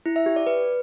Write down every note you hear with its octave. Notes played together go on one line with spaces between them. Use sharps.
E4
E5
G4
D5
B4